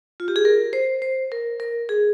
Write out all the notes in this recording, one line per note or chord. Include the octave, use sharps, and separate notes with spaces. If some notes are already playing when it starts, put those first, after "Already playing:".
F4
G4
G#4
A#4
C5
C5
A#4
A#4
G#4